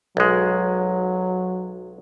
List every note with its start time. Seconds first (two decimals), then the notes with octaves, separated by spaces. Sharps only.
0.17 B1 F#3 G#3